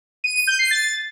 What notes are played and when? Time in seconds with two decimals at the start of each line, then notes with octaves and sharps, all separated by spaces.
0.24 D#7
0.36 D#7
0.47 G6
0.59 C7
0.71 A6